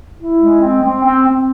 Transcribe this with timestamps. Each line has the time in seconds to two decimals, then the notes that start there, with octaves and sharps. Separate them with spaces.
0.19 E4
0.39 G#3
0.60 C4
0.83 C4
1.03 C4
1.25 C4